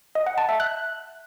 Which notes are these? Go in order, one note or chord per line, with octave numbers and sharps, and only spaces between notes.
D#5
F#5
A5
E5
F#6